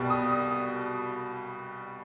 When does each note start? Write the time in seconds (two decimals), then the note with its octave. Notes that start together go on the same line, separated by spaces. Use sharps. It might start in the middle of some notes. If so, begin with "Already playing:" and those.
Already playing: C2 B2 G3
0.10 D#6
0.32 D#6